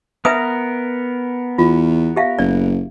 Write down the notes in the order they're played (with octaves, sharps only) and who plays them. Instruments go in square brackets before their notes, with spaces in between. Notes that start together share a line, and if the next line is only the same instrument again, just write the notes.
[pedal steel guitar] B3 A#4 [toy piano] B4 E5 D#6
[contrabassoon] E2 [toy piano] F4
[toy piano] G4 E5 F5
[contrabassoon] F#1 [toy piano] D5